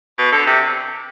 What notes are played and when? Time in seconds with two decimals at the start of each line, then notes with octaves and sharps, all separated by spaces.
0.19 B2
0.32 D3
0.47 C3